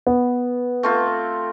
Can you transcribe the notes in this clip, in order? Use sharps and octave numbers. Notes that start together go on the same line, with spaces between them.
B3
A3 C4 F4